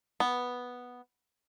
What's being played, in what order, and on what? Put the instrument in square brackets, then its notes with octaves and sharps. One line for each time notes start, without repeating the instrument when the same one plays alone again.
[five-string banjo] B3